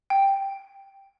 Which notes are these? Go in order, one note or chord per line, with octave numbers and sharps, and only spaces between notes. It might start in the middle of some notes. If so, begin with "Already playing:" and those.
G5